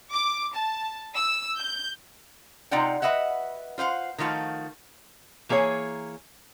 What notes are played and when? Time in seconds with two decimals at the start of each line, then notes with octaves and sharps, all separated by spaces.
0.12 D6
0.54 A5
1.14 E6
1.58 G6
2.71 C3 D#4 F4 D5 F#5 G5
3.02 F#4 B4 D#5 E5 F#5
3.78 F4 C5 F5 F#5
4.18 D#3 F3 A3 F4 F#4
5.49 E3 A#3 G#4 C5 C#5